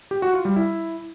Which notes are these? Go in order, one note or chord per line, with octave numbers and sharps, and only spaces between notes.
G4
F#4
F4
G3
E4